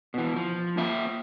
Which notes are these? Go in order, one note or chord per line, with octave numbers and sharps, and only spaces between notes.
B2 E3
F3
A#3 F4 E5